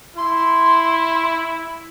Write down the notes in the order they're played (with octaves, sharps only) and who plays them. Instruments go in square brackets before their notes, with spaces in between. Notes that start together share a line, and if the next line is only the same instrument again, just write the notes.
[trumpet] E4 [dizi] C6